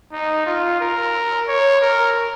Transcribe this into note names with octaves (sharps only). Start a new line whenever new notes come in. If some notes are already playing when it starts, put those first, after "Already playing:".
D#4
F4
A#4
C#5
A#4